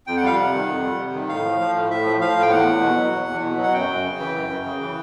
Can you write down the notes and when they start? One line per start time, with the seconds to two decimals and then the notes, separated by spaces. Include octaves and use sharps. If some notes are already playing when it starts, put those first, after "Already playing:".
0.07 F2 G5
0.17 F#5
0.23 G3 F5
0.35 C3 F#5
0.54 D#3
0.68 F2
0.84 G3
0.98 C3
1.14 D#3
1.29 A2 F5
1.45 F3
1.60 F3
1.75 A2
1.91 A2 E5
2.06 F3
2.21 F3 F5
2.37 A2
2.42 G5
2.51 E2 F#5
2.67 E2
2.82 B2
2.97 F#3
3.12 E2
3.28 E2
3.43 B2
3.58 F#3
3.63 F#5
3.74 F#2 G5
3.88 F#2
4.04 C#3
4.19 E3
4.35 F#2
4.49 F#2
4.65 C#3
4.81 E3